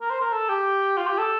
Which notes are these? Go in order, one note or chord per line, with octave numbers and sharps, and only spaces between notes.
A#4
C5
A#4
A4
G4
F4
G4
A4